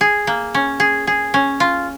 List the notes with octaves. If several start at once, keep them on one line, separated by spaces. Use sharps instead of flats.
G#4
A#3
C#4
G#4
G#4
C#4
F4